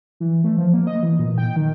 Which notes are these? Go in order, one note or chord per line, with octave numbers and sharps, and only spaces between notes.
E3
A3
F3
A#3
D#5
E3
A#2
G5
D#3